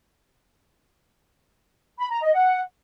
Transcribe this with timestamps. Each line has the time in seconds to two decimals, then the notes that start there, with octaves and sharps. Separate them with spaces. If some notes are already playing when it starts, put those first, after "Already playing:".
1.98 B5
2.10 A#5
2.22 D#5
2.33 F#5